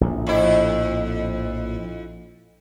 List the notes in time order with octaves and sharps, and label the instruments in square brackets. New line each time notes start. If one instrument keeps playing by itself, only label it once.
[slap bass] A#1 A2
[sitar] F2 E4